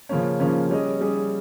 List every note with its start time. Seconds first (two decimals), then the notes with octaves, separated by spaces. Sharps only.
0.09 C#3 F3 A#3 C#4
0.40 C#3 F3 A#3 C#4
0.70 G3 C#4 G#4 D#5
1.01 G3 C#4 G#4 D#5